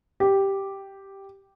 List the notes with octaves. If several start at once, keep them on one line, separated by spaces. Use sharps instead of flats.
G4